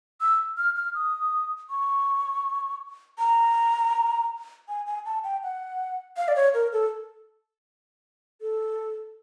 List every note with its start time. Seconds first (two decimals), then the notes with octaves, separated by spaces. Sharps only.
0.21 E6
0.57 F6
0.76 F6
0.95 D#6
1.70 C#6
3.19 A#5
4.69 G#5
4.87 G#5
5.06 A5
5.24 G5
5.43 F#5
6.17 F5
6.28 D5
6.36 C#5
6.54 A#4
6.73 A4
8.41 A4